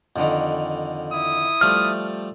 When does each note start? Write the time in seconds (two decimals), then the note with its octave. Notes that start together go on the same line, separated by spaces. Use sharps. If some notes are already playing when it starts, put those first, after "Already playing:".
0.16 F2 D3 D#3
1.13 E4 D#6
1.61 F3 G3 A3 F6